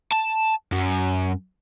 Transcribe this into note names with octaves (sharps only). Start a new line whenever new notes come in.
A5
F#2